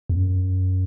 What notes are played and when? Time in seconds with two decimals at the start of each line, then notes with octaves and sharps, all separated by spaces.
0.09 E2
0.16 F#2